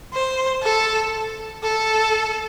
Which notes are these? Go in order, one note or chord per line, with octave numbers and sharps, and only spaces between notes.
C5
A4
A4